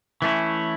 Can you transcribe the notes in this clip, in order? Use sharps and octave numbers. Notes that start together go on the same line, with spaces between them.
E3 A3 C#4 E4